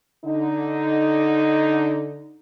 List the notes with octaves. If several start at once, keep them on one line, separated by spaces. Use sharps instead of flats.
D3 D#4